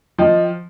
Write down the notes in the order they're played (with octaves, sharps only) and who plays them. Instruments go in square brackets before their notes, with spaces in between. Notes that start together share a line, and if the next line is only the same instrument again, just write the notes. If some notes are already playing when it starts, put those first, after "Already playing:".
[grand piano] F3 [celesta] D#5 G5